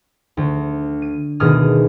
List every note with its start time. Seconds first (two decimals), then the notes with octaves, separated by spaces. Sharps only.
0.37 D2
1.02 D#7
1.40 D2 B2 D#3 G#4 D#6 F6